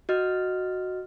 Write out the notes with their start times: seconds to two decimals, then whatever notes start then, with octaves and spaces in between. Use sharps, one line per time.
0.09 F#4 D#5 F6